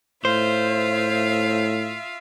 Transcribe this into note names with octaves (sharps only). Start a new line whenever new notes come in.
A2 F4 C5 E5 F5